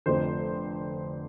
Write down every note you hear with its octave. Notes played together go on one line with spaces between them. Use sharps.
F1 F2 D3 C5